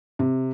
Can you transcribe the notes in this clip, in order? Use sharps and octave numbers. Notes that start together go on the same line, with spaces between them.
C3